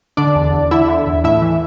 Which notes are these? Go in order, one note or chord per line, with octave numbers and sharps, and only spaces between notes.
D3 D4 D5
E2
E2
D3 E4 E5
D3
E2
A2 E4 E5
E3